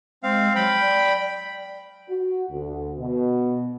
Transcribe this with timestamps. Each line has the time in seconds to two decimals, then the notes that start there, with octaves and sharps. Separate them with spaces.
0.23 G#3 C4 F5
0.56 F#3 G5 B5
0.80 D5
2.08 F#4
2.50 D2
2.99 B2